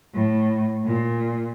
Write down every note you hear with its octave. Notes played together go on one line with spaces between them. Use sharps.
A2
A#2